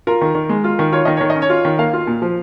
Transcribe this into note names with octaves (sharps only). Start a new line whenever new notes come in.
F4 A#4
D#3
D#3
G#3
F4
D#3
F4 C#5
D#3 D#5
D#3 C#5
D#5
C#4
C#5
F4
D#3
A#3 F5
F4
A#2
F3